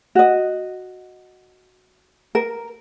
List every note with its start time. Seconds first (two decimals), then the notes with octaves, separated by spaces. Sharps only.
0.15 F#4 D#5
2.35 A#4